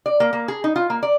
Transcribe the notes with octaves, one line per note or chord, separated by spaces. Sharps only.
D5
A#3
A#3
G#4
D#4
F4
A#3
D5